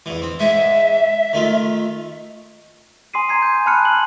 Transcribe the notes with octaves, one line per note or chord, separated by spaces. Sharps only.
E2 E3
C4
G#2 E5
D#3 A3 F4
G#5 C6 D#6 C7 D#7
G#5 A#5 G#6 C7
G6
A5 B5 F6 F#6 C#7
C6 F#7